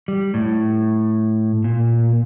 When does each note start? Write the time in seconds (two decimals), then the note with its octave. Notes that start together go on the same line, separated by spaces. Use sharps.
0.08 G3
0.34 A2
1.64 A#2